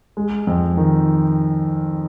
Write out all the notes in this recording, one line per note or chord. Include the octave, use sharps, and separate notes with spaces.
G#3
F2
D#3